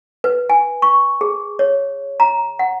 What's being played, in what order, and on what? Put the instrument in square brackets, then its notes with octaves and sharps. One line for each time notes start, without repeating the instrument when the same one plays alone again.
[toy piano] B4
G#5
C#6
G#4
C#5
A#5
F#5